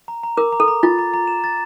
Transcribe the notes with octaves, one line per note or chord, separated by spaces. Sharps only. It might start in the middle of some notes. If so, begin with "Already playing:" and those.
A#5
A#5
A#4 D6
A#5
A4
A#5
F4 A6
A#5
A#5
E7
A6